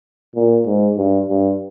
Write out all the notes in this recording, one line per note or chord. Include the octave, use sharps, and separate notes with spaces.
A#2
G#2
G2
G2